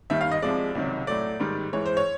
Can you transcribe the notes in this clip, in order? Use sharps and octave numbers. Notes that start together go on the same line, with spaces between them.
D#2 D#3 G3 E5
F5
D#5
C2 C3 F3 G#3 D5
C#2 C3 D#3 F#3
A2 F#3 A3 D5
G#2 D#3 G3
G#2 E3 G#3 C#5
C5
C#5